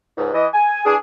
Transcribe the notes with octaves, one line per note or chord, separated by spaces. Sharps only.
C#2 G#2
E3 D#5
G#5
E3 D4 G#4